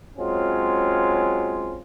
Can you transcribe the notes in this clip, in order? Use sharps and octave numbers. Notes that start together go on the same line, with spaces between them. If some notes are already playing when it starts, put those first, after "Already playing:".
F#3 G#3 C4 C#4 F4